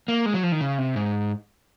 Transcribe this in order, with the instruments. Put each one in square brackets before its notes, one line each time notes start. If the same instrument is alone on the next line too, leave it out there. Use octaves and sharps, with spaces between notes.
[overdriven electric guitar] A#3
G#3
F#3
F3
D#3
C#3
C3
G#2